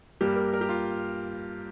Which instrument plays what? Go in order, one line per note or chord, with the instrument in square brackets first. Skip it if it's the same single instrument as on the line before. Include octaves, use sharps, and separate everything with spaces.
[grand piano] G2 G3 A#3 G4
A#4
A#4
G4
F4